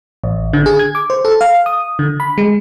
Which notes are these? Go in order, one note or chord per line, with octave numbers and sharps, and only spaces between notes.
A1
D3
G#4
G#6
D6
C5
A4
F5
D#6
D3
B5
G#3